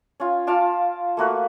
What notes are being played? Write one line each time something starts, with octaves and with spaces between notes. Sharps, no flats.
C#4 F4
F4 F5 A5 D6
A3 A#3 F#4 B4